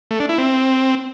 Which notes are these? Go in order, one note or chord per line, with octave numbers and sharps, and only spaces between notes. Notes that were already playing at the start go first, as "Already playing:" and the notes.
A3
D4
E4
C4